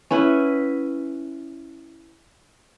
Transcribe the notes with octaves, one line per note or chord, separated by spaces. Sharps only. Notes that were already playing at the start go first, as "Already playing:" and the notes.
C#4 E4 B4 F#5